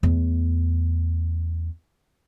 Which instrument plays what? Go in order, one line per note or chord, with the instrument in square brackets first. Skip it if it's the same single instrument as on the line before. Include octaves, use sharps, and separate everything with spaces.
[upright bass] E2 A3